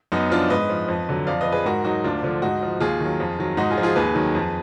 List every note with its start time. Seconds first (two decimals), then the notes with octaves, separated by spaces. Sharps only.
0.12 F#2 B3 D#4
0.32 F3 D4 F4
0.50 G#2 B4 D#5
0.70 F3
0.88 F2
1.09 D3 F#3
1.27 F2 D5 F5
1.41 B4 D#5
1.46 F3
1.52 G#4 B4
1.66 G#2 F#4 A#4
1.84 F#3 D#4 F#4
2.04 D2 D4 F4
2.23 D3 F3
2.42 G#2 D#4 F#4
2.62 F3
2.80 D#2 F4 G#4
3.00 D#3 F#3
3.20 F2
3.39 D#3 F#3
3.57 G#2 D#4 F#4
3.70 F4 G#4
3.77 F3
3.83 F4 G#4
3.96 D#2 G#4 B4
4.15 D#3 F#3
4.35 F2